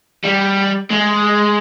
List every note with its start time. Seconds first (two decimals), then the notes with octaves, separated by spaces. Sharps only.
0.25 G3
0.91 G#3